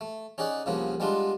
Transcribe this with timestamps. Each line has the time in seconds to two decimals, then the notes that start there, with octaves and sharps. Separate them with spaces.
0.01 A3
0.38 C#4 D#4 G#4 D5 F#5
0.66 C2 C#3 F3 A#3 B3
1.00 G3 G#3 B3 D4 F4